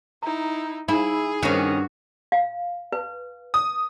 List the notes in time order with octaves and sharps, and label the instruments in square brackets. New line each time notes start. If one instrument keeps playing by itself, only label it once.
[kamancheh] D#4 E4 [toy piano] A#5
[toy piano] D#4 [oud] E4 [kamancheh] G#4
[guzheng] G2 F#4 [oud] D#3 C#4
[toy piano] F5
B4
[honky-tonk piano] D#6